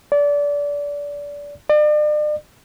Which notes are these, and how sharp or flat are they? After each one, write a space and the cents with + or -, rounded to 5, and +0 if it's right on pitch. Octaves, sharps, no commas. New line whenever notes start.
D5 -25
D5 +40